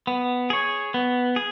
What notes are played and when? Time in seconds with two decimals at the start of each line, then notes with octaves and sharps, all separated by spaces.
0.07 B3
0.50 G#4 C#5
0.94 B3
1.36 G#4